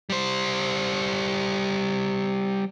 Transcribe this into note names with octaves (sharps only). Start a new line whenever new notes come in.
G3 C5